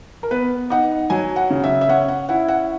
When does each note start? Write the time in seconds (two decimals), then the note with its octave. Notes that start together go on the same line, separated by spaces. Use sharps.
0.23 A#4
0.31 B3 B4
0.70 D#4 F#5
1.10 F#3 G#5
1.36 F#5
1.50 C#3
1.64 E5
1.81 E5
1.89 C#4 F#5
2.08 F#5
2.29 E4 F#5
2.48 F#5